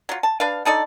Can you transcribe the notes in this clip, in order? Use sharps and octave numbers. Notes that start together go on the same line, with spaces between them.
F#3 F4
A5
D4 B4 F5
D3 D#4 A4 D5